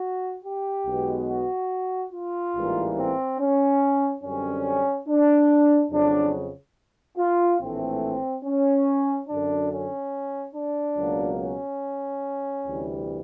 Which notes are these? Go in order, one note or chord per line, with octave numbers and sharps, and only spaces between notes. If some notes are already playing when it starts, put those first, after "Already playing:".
Already playing: F#4
G4
B1 B2 G#3 B3
F#4
F4
A1 G#2 E3 G3 A#3
C4
C#4
F#2 D3 G3 C4 C#4
D4
F2 C#3 F#3 D4
F4
A#1 A2 E3 A3 C4
C#4
F#2 D3 F#3 D4
C#4
D4
C#2 B2 F#3 A#3
C#4
D2 C3 E3 G3